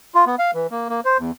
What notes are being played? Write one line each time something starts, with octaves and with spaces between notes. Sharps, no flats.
F4
B3
F5
E3
A#3
A#3
C5
E2